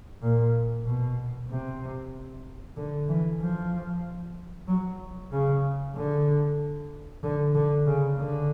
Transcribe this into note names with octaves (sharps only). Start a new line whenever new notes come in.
A#2
B2
C3
D3
E3
F3
F#3
C#3
D3
D3
D3
C#3
D3